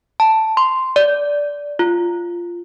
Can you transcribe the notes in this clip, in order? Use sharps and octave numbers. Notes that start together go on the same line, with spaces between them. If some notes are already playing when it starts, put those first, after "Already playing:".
A5
C6
D5
F4